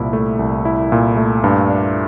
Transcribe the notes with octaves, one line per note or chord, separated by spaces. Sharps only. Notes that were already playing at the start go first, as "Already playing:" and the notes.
Already playing: C2 A#2 E4
A3
C2
E4
A#2
A3
G2
D4